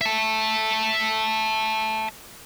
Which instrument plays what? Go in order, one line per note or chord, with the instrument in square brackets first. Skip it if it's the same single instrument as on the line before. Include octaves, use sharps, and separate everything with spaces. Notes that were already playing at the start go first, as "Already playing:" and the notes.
[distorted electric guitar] E5 A5